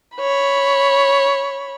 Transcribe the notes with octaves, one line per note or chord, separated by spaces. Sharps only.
C#5 B5